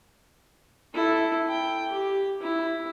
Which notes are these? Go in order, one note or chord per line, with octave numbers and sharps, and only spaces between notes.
E4 A4
G5
G4
E4